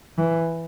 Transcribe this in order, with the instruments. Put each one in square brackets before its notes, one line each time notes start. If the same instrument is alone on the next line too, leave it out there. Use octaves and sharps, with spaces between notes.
[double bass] E3